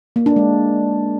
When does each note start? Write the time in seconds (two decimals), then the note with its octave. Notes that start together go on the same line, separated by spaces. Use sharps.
0.16 A#3
0.26 D4
0.36 G#3